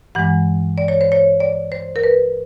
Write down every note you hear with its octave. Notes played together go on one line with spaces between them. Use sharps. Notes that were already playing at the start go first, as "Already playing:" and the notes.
G2 E3 G#3 F#5
D5
C#5
C5
C#5
D5
C5
A#4
B4